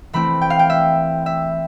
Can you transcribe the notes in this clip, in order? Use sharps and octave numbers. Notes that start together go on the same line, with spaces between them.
E3 A3 C4 E4 B5
G5
F5
G5
E5
E5